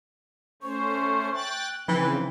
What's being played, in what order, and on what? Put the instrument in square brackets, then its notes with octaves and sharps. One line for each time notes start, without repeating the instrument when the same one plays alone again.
[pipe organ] A3 C#4 C5 [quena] C#6
[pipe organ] G5 F#6 A6
[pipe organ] C#3 C4 [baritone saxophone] E3 [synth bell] F3 [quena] G5